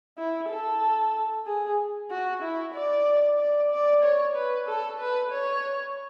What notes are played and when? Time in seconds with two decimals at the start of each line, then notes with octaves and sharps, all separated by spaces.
0.18 E4
0.49 A4
1.46 G#4
2.10 F#4
2.42 E4
2.74 D5
3.38 D5
3.71 D5
4.02 C#5
4.35 B4
4.67 A4
5.00 B4
5.31 C#5